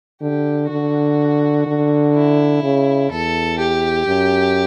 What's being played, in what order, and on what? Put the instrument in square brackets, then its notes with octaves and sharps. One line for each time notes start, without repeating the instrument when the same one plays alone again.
[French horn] D3 [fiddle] G4
[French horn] D3 [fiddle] F#4
[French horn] D3
[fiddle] E4
[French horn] C#3
[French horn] E2 [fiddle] A4
[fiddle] G4
[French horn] F#2